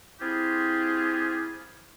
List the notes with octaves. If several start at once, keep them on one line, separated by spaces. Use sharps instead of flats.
C4 E4 F4 G4 G#4